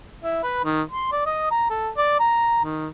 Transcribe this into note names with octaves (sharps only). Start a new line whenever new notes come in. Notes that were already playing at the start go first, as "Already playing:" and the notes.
E4
B4
D#3
C6
D5
D#5
A#5
A4
D5
A#5
D#3